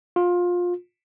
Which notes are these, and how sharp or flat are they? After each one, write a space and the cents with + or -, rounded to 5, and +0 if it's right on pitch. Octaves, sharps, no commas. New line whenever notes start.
F4 +20